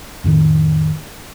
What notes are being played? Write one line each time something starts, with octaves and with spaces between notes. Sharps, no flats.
F2 A2 D#3